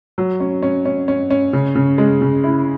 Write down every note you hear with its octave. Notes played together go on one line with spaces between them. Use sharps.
F#3
C#4
C#4
C#4
C#4
C#4
C#3
C#3
G#3
C#3
E4